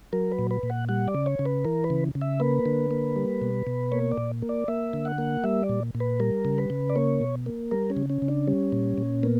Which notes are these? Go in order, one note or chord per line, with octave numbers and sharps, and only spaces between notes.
F#3 A#4
B4
A#2
B4
A#2
F#5
G3 F#5
D5
C#3
C#5
C#3
B4
E3 A#4
B4
C#3
C#3
E5
A#3 B4
D3
A#3
G3
B2
B2
A#3 C#5
D5
A#2
A#3
D5
A#3 E5
D3
F#5
A#3
G3 E5
D5
A#2
A#2
B4
G3 A#4
C#3
B4
C#3
D5
A#3 C#5
B2
A#3
G3 A#4
C#4
C#3
C#4
C#3
D4
G3 C#4
A#2
A#2
A#3 B3